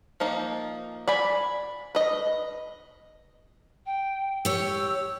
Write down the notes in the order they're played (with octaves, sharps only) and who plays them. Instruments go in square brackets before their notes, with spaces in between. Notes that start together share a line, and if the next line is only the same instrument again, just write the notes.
[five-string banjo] F3 A#3 D#4
D5 G#5 B5
B4 D#5
[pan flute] G5
[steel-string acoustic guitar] G4 C#5 [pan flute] E6